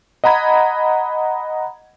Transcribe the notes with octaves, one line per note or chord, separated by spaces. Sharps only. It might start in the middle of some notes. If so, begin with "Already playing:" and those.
D#5 F#5 A#5 B5 G#6